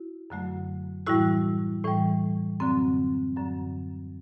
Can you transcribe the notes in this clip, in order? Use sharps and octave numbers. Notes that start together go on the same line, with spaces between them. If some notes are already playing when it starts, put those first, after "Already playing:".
Already playing: E4 F#4
F#2 D3 F#3 A3
A2 E3 G3 E4 F#4
A2 E3 G3
F#2 D3 F#3 C4
F#2 D3 F#3